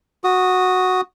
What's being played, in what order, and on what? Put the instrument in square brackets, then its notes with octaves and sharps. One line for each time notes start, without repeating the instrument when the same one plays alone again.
[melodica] F#4 D#6